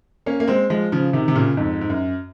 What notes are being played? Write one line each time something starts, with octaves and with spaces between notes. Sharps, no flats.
A#3 C#4
A#3
G#3 C4
F3 G#3
C#3 F3
C3 D#3
C3
A#2 C#3
F2 G#2
G#2
F#2